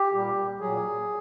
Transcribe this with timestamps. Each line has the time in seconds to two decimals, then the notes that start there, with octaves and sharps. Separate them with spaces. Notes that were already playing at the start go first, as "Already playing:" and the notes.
Already playing: G4
0.14 A#2 G3
0.60 A#2 F#3 G#4